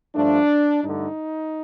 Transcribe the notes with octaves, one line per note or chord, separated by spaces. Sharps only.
G2 F3 A3 D4
G2 D3 A3 D#4